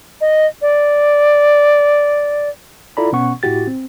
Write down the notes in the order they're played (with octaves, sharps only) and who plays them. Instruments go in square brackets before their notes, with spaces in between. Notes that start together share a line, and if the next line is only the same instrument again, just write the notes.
[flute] D#5
D5
[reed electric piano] E4 F4 A4 D5 A#5 B5
B2 B3 C#4 F#5 C#6
A2 E4 F#4 G4 A6
C4